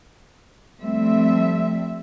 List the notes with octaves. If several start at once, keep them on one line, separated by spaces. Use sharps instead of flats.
F3 G3 A3 C4 E5